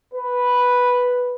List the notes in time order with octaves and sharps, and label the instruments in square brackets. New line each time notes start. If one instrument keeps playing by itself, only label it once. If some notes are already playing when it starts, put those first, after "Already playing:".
[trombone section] B4